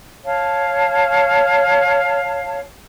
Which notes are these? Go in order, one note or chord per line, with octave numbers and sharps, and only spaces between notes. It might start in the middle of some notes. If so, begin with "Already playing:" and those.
C#5 F5 A5